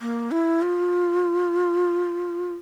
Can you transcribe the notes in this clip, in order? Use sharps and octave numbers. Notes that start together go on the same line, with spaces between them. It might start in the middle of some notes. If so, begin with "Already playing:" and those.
A#3
E4
F4